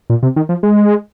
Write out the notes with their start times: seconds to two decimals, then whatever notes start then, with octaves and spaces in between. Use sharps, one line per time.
0.10 A#2
0.23 C3
0.36 D#3
0.49 F3
0.63 G#3